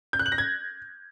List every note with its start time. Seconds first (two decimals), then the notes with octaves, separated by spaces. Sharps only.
0.13 G6
0.19 F#6
0.26 F#7
0.32 A#6
0.38 G#6